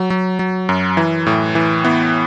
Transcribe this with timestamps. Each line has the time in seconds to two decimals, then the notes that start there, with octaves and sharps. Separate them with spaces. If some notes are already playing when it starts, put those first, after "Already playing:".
Already playing: F#3
0.10 F#3
0.39 F#3
0.69 F#2
0.97 E3
1.26 A2
1.55 E3
1.84 E3 B3